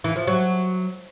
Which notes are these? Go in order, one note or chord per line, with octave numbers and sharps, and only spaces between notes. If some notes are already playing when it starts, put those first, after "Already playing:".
E3
F3
F#3